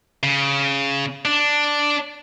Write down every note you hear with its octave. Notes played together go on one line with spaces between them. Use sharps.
C#3
D4